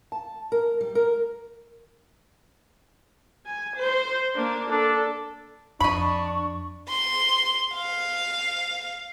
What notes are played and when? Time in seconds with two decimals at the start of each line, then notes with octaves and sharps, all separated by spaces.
0.12 A5
0.52 A#4
0.81 G3
0.95 A#4
3.46 G#5
3.77 C5
4.36 A#3 D4
4.70 D4 A4
5.80 F2 D4 D#5 B5 C#6
6.89 C6
7.76 F5